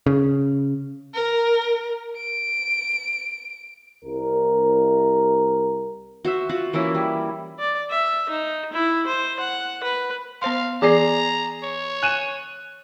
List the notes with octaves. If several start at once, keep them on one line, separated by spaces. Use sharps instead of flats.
C#3
A#4
D7
C2 A#4
F#4 C5 E5
F4 F#4 F#5
E3 A#3 C#4 E4
G3
D5
E5
D#4
E4
C5
F#5
B4
B3 C5 F5 C6
E3 B3 G#4 D5 A#5
C#5
G#5 F#6 D#7 E7